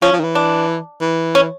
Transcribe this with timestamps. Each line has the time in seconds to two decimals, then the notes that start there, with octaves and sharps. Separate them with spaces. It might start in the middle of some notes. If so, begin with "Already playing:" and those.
0.02 F3 C#4
0.13 F3
0.19 D#3
0.24 E3
0.35 D4
1.01 E3
1.35 C#4